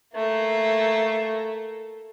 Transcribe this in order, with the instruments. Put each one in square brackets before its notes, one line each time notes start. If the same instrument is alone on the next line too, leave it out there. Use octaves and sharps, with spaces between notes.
[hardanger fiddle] A3 A#3